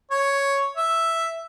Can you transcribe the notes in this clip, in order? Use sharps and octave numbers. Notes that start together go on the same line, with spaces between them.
C#5
E5